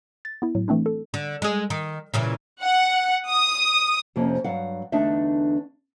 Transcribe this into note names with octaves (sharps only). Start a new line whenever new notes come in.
A6
B3 E4
A2 F#3
E3 A3 C4 D4 E4
A4
D3
G#3 G#4
D#3
A#2 C#3 E3
F#5
D#6
F2 C3 F3 A#3 C4 C#4
G2 F#3 F5 F#5
E2 D3 A3 D4 D#4 E5